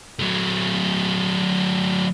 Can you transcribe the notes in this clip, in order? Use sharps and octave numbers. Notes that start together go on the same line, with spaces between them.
F#3 A3